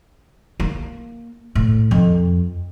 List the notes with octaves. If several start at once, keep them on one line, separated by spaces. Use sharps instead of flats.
A#3
A2
F2